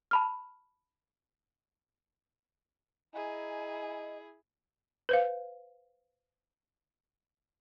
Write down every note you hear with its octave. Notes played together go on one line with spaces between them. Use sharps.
A5 B5 F6
E4 G#4 D#5 G#5 A#5
B4 C5 F5